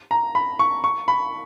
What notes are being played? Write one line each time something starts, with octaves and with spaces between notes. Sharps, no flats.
A#5
B5
C#6
C#6
B5